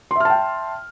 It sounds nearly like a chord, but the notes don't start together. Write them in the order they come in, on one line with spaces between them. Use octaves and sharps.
C6 E5 F6 A5 G5